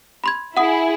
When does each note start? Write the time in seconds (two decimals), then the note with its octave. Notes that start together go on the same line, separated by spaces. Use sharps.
0.24 B5 C6 G#6
0.57 E4 G#4 F#5 D#6